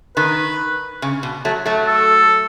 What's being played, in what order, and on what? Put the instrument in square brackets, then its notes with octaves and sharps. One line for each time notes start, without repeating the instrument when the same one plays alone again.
[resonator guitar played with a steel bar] D#3 [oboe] B4
[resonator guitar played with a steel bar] C#3
B2
F#3 A3
F#3 A3
[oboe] A4